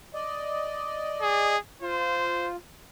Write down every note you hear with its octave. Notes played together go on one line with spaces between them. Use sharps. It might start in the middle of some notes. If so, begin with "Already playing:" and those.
D5 D#5
G#4
F4 C5